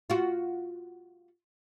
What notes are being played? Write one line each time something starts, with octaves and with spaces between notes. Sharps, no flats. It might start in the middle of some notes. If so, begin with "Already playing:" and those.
F4 F#4